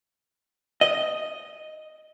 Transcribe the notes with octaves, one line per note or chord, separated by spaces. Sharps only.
D#5